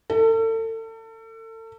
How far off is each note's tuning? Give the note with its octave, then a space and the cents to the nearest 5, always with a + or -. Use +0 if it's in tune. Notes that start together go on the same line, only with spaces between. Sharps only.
A4 +35